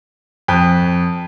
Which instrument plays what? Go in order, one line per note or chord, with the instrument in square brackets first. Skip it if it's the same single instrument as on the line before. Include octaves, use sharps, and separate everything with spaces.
[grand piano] F2